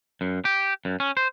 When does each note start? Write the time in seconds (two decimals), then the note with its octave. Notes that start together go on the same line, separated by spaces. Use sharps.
0.21 F#2
0.45 G4
0.85 F#2
1.00 C#4
1.17 C5